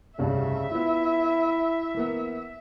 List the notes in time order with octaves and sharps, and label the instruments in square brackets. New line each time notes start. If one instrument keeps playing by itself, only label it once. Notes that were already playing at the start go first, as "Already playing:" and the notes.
[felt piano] F1 C2 G2 [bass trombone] C#3 [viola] E5
[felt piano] F3 B3 [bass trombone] E4
[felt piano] E3 A#3 B3